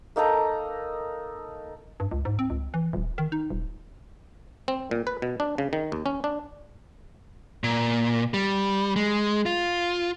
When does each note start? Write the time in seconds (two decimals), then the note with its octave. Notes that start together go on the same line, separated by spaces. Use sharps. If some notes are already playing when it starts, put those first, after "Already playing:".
0.16 A#3 D#4 A4 A#5
2.00 G2
2.11 C#2
2.25 G#2
2.39 C4
2.50 C#2
2.74 E3
2.93 D#1
3.18 D#3
3.32 D#4
3.50 D#1
4.68 C4
4.91 A#2
5.07 B4
5.22 B2
5.40 D4
5.58 C#3
5.73 D#3
5.92 D#2
6.06 C#4
6.24 D4
7.64 A#2
8.34 G3
8.96 G#3
9.46 F4